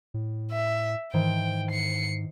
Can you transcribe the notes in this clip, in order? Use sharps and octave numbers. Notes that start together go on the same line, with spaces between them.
A2
E5
G#2 D#3 E3 C5 G5
C7 C#7